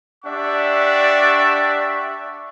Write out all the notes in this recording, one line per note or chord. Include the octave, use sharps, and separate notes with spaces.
D4 G4 D5 E5 F#5 C#6